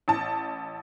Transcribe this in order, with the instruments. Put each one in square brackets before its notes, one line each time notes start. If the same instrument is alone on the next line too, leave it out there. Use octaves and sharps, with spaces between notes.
[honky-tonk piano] A1 A5